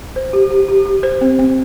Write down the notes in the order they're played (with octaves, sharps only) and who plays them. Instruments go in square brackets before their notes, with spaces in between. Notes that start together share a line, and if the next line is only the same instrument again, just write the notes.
[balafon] C5
G4
G4
G4
G4
C5
C4
C4